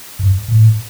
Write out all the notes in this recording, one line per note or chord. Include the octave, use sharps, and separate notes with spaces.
G2
A2